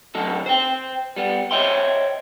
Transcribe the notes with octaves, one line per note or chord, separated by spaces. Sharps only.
D2 D3 F#3 D#4 A4
C5 G5
G3 B3
C5 C#5 D#5 E5 G5 C6